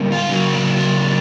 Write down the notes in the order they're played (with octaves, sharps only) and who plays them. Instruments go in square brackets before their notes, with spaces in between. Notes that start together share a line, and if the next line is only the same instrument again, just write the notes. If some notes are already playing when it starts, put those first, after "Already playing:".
Already playing: [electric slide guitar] D3 G3 A#3 C#4
F4
C#3 F#3 A#3 C#4
D4
D4